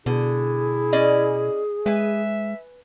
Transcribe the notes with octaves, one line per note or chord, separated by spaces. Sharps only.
B2 D3 E4 G#4
C#4 D5 D#5
G#3 B4 E5 G#5